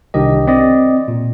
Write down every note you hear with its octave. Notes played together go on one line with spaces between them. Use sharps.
C2 D#3 D4 G4 D#5
C4 D5 D#5
A#2